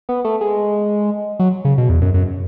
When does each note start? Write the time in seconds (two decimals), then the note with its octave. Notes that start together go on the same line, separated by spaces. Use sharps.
0.09 B3
0.24 A3
0.41 G#3
1.39 F#3
1.65 C#3
1.78 B2
1.89 E2
2.02 F#2
2.14 F#2